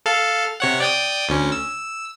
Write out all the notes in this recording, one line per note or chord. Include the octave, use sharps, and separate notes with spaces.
A4 F5
C3 C#5 F#5
D5 G5 D#6
D2 C#4
E6